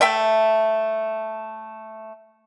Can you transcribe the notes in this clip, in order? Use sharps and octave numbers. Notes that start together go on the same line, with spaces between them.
A3 E5 G5